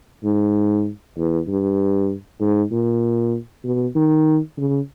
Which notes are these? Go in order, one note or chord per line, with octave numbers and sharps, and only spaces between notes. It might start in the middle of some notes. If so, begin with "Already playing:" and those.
G#2
E2
G2
G#2
A#2
B2
D#3
C#3